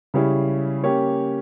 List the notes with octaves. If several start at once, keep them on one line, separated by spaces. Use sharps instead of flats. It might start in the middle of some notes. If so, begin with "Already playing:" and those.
C#3 G3 C#4 E4
A#3 C#4 G4 C#5